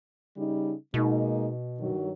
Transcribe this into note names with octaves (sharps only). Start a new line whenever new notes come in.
C#3 G3 D#4
B2 G#3 A#3 D#4
G2 D#3 F#3